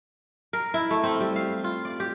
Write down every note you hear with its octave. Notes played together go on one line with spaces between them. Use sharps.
A#4
E4
A3
C4
G3
F5
F4
D5
G4